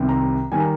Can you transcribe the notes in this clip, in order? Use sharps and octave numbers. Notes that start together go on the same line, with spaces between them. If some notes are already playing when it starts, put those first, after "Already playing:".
Already playing: C2 C3 D#3
A#5
D#3 G3 G#5
A#5